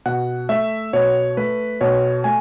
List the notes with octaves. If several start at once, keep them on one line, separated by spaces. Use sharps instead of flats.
B2 F#5
A3 E5
B2 C#5
A3 B4
B2 C#5
A3 G#5